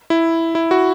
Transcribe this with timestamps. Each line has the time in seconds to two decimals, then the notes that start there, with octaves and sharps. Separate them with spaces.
0.10 E4
0.55 E4
0.71 F#4